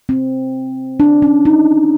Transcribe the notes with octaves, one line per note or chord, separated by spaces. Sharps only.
C4
D4
C#4
D#4